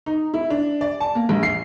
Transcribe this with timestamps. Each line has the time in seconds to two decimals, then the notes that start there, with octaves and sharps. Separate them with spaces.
0.06 D#4
0.34 E4
0.50 D4
0.81 D5
1.00 A5
1.15 A#3
1.29 A#1
1.43 C7